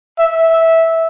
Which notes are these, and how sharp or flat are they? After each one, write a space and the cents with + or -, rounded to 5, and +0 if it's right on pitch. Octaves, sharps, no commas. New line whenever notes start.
E5 -15